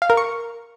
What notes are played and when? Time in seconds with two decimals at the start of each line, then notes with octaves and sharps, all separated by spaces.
0.02 F5
0.10 A#4
0.17 C#6